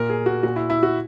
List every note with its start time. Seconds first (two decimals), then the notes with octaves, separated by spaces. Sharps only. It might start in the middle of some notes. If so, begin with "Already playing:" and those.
Already playing: A#2 A#4
0.10 G#4
0.26 F#4
0.43 A#2 F#4
0.56 E4
0.70 E4
0.83 F#4